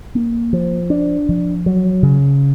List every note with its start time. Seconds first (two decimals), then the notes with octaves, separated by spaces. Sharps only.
0.15 A#3
0.53 F3
0.90 D4
1.29 F3
1.66 F#3
2.02 C#3